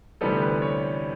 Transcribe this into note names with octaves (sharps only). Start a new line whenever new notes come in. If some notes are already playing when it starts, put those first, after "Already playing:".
D2 C3 E3 G3 B3 A4
B4
C#5